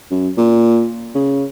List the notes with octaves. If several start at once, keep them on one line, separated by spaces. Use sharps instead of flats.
F#2
A#2
C#3